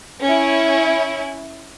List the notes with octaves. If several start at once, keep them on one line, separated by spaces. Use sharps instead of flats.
C#4 E4